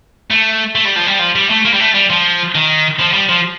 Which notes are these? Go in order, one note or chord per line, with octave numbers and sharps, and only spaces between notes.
A3
A3
G3
F3
G3
F3
G3
A3
A#3
G3
A3
G3
F3
D#3
F3
G3
F3